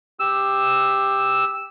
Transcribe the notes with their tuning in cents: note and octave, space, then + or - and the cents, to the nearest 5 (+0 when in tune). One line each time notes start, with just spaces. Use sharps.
G4 +10 E6 +0